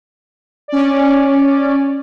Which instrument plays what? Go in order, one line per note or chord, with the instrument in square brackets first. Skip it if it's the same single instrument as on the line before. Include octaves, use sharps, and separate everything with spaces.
[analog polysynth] C#4 D5